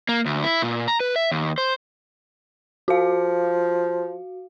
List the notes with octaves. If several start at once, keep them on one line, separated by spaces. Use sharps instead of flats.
A#3
D2
E4
A#2
A#5
B4
E5
D#2
C5
F3 F#4 F5